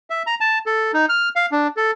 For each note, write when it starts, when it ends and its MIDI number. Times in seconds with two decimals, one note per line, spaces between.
0.10 0.23 76
0.27 0.35 82
0.40 0.58 81
0.66 0.91 69
0.93 1.06 63
1.09 1.29 89
1.36 1.46 77
1.52 1.67 62
1.77 1.91 69